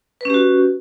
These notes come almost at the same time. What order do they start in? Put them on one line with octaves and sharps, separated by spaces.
B4 C#4 G4 F#4